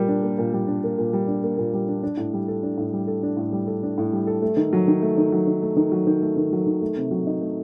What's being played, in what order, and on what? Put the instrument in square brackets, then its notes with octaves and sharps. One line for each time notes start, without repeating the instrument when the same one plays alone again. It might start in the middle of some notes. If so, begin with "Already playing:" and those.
Already playing: [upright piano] A#2 G3 A#3
D4
A#3
A#2
G3
D4
A#3
A#2
G3
D4
A#3
A#2
G3
D4
D4
A2
G3
A4
D4
A2
G3
A4
D4
A2
G3
A4
D4
A2
G3
A4
A3
D#3
F#3
D#3
A3
D#3
F#3
D#3
A3
D#3
F#3
D#3
A3
D#3
F#3
D#3
A3
C3
F#3
D#4
A3